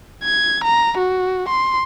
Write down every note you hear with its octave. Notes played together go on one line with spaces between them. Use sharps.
G#6
A#5
F#4
C6